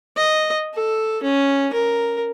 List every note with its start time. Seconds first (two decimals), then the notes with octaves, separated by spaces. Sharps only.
0.16 D#5
0.74 A4
1.23 C#4
1.73 A#4